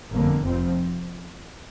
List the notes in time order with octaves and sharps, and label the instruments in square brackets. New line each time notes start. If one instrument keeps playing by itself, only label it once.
[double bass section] G1 F2 D3 A#3
F1 F2 F3 C4